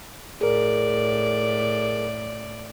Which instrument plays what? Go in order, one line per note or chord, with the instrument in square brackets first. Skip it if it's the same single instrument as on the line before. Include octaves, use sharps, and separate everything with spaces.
[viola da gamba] A2 D5 [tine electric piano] G#4 A#4